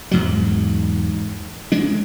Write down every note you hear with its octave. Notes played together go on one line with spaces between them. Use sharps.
E2 G#2 F#3
G#3 D4